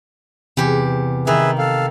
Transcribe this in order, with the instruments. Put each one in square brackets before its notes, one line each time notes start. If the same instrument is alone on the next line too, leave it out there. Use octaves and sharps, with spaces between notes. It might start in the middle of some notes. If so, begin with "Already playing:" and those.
[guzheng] E2 G4 [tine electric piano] C3
[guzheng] D#3 [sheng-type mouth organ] G#4 B4 E5
[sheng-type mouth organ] A4 F5